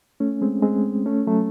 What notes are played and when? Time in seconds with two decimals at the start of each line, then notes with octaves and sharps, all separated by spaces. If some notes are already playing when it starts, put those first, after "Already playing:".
0.20 A3 C#4
0.42 G#3 C4
0.63 G#3 C4
1.06 A3 C#4
1.27 F#3 A3